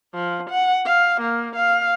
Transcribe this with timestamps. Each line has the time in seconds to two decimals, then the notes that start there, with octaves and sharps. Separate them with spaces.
0.14 F3
0.50 F#5
0.85 F5
1.20 A#3
1.55 F5